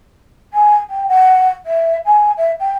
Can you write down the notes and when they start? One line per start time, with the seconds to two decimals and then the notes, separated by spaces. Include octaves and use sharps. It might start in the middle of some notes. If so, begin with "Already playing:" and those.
0.53 G#5
0.90 G5
1.08 F#5
1.66 E5
2.06 G#5
2.37 E5
2.60 G5